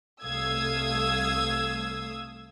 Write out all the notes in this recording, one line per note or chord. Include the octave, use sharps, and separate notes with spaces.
C2 A3 F5 D#6 E6 G#6